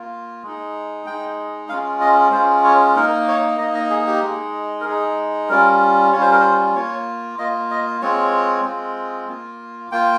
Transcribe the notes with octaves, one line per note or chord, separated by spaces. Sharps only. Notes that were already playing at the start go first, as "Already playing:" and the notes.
Already playing: A#3 F4
G#3 D#4
G#3 D#4 G5
G#3 C#4 F4 F5
D#5
G#3 C#4 F4 C5
C#5
A#3 D#4 A#4
C#5
A#3 D#4 D#5
D#5
G#4
G4
G#3 D#4
A#4
G#3 D#4 G#4
G3 C#4 F4 A#4
G3 C#4 F4 C#5
C5
A#4
C5
A#3 F4 C#5
A#3 F4 D#5
D#5
G#3 C4 F4 C#5
G#3 C4 F4
A#3 F4
A#3 F4 G5